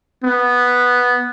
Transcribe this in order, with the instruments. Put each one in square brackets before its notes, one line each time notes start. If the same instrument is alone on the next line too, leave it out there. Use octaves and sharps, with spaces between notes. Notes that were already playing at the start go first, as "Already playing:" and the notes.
[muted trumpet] B3